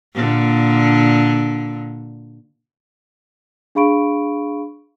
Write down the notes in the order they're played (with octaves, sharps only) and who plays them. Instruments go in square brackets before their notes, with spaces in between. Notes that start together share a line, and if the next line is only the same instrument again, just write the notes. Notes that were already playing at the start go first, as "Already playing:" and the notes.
[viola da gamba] A#2 D3
[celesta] D4 G#4 F5 B5 C#6 D7